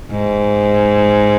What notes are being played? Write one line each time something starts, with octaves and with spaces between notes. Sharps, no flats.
G#2